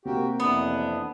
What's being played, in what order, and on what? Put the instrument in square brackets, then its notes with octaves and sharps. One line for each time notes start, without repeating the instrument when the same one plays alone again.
[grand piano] C3 A#3 [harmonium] F#4 G4
[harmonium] F2 E3 D4 [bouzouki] B3